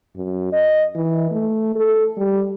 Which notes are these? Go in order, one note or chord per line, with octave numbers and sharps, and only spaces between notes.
F#2
D#5
E3
A3
A4
G3